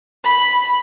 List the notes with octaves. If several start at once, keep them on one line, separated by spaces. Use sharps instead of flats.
B5